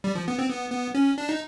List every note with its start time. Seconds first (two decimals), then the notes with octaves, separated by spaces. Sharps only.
0.04 G3
0.15 F3
0.28 B3
0.39 C4
0.50 B3
0.72 B3
0.95 C#4
1.18 D4
1.29 D#4